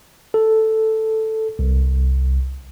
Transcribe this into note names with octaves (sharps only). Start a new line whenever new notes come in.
A4
C2